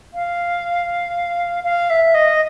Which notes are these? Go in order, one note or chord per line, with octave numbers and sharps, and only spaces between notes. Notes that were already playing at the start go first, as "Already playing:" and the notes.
F5
F5
E5
D#5